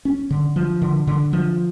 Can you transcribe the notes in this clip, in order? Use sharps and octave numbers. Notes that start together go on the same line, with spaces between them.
C#4
D3
F3
D3
D3
F3